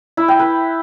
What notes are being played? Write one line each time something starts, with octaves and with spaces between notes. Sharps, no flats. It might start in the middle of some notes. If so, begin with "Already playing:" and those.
E4
G5
B4